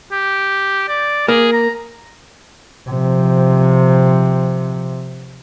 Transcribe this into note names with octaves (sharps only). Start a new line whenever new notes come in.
G4
D5
A#3 G#4
A#5
C3 F3